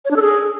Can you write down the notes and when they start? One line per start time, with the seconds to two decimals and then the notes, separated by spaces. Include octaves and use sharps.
0.05 C#5
0.11 D4
0.16 A4
0.22 G#4